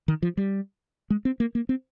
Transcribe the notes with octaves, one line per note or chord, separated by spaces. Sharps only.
D#3
F3
G3
G#3
C4
A#3
A#3
C4